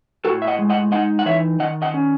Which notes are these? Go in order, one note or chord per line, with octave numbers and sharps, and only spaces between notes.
A2 F#4 A4
E5
D#5 F#5
G#3
D#5 F#5
D#4 D#5 F#5
F#5
E3 C#5 E5
D#3 D#5 F#5
D#5 F#5
C#4